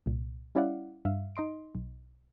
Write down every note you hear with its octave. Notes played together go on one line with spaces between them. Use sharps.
C2 A#2
G3 C#4 E4 D5 F5 F#5
G2 E5 F5
D#4 D#5 C6 D7
B1